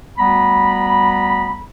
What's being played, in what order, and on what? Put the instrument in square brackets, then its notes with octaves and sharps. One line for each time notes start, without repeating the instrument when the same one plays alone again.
[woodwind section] D2 G3 B3 A#5 B5